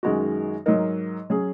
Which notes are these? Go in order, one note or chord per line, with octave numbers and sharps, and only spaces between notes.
F#2 D#3 G#3 D#4 F#4
G#2 F#3 D#4 A#4
F#3 C#4 G#4